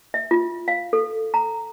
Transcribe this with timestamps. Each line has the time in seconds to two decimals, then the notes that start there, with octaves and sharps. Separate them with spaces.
0.14 E5
0.31 F4
0.68 F5
0.93 A4
1.34 A#5